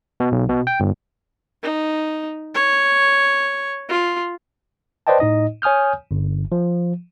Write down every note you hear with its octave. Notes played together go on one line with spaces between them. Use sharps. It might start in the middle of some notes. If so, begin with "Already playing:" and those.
B2
B1
B2
G5
G1
D#4
C#5
F4
B4 C5 D5 D#5 G5 A5
A2 D#4 D#5
C#5 G#5 D#6 F6 G6
G1
F3